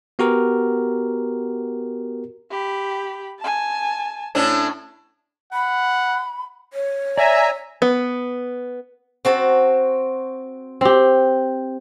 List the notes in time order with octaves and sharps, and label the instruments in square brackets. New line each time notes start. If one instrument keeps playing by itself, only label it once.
[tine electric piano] B3 F#4 G4 A#4
[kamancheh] G4 B5
G#5 A5
[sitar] A2 C#4 D4
[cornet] F#5 [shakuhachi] B5
[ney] C#5
[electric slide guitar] D5 [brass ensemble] E5 [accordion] G#5 A#5
[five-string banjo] B3
[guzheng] C4 F#4 A5
[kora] C4 G4